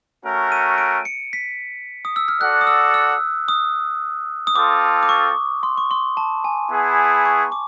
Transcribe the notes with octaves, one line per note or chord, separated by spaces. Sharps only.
A3 C#4 F#4 A#4
D#7
D7
C#7
B6
D#6
E6
F6
F#4 A4 D5 F#5 F#6
D#6
E6
E6
D#6
D#6
C4 F4 A4 D6
D6
C#6
C6
C#6
C6
A5
G#5
B3 E4 G#4
C#6
D6